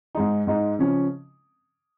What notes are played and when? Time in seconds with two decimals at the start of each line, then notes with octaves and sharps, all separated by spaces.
0.15 G#2 G#3 D#4
0.47 G#2 G#3 D#4
0.79 C#3 F3 C#4